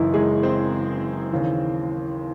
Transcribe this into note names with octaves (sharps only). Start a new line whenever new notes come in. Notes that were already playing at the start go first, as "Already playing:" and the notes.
Already playing: F#1 F#2 C#3 E3 D#4 E4
G#3 G#4
C4 C5
D#2 C#3 E3